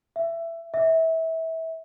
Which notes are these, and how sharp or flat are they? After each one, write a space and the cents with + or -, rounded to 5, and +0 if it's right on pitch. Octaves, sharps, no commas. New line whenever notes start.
E5 +15
E5 -25